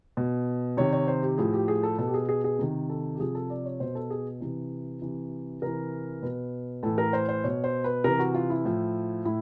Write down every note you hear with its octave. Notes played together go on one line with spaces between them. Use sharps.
B2
C3 D#3 C#5
C#5
C5
G4
A2 F3 G#4
G4
G#4
A4
B2 A4
G4
G#4
G#4
G#4
C3 D#3
A4
G4
C3 F3 G#4
A4
D5
C#5
B2 C5
A4
G#4
C3 E3
C3 E3
C3 E3 A#4
B2 B4
A2 E3 A4
A#4
C5
C5
B2 C#5
C5
B4
C3 E3 A#4
F#4
F4
E4
A2 F3
A2 E4